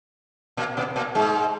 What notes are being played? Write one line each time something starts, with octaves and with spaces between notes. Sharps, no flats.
A#2 A#3
B2 B3
A#2 A#3
G#2 G#3